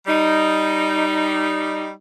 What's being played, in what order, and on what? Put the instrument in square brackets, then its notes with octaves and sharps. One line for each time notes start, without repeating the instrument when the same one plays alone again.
[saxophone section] G3 D#4